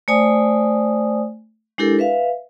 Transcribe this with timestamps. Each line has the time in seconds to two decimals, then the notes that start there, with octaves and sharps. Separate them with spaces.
0.08 A3 C5 D5 G#5 D#6
1.78 G#3 D4 E4 G4 A4 A#4
1.99 B4 E5 F5